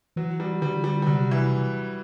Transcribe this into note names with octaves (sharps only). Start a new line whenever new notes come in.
E3 F#3
G3
D3 G3
G3
G3
C3 F#3
E3